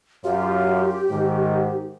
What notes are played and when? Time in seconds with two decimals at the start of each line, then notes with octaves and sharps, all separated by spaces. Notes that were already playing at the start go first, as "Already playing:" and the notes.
0.24 F#2 F4 G4
1.10 G#2 D#3